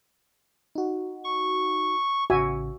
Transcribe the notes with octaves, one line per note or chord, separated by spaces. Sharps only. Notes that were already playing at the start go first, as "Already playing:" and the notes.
D#4 F#4
C#6
A1 C#3 F#4 E5 G#5